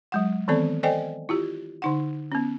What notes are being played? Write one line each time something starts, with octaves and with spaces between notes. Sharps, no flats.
F#3 G#3 F#5
D#3 E3 B3 C4 A4 D5
A4 C5 D5 D#5 G5 G#5
E4 F4 G4
D3 D#4 F#5
B3 C#4